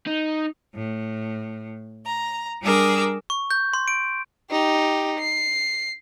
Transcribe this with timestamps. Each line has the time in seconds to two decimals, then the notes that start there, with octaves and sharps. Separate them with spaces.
0.07 D#4
0.74 A2
2.05 A#5
2.62 G3 D4 G#4 A#4 D6 E6
3.30 C#6
3.51 G6
3.73 C6
3.88 D7
4.51 D#4 G4
5.20 C7